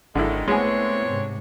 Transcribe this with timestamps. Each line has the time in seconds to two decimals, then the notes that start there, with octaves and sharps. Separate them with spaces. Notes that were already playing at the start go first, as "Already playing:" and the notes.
0.15 G#1 D3 D#3 G#3 E4
0.48 G#3 A3 B3 C4 D4 E4 C#5 G#5
1.08 G#2 C3